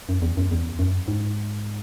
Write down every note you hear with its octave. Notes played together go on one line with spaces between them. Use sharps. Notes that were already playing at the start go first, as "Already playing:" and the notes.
F#2
E2
F#2
E2
F#2
G#2